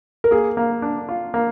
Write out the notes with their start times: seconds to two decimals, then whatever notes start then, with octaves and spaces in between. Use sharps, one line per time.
0.24 A#4
0.31 A#3 G#4
0.57 A#3
0.82 D4
1.09 F4
1.34 A#3